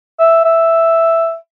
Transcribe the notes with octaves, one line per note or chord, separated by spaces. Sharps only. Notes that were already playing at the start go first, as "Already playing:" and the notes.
E5
E5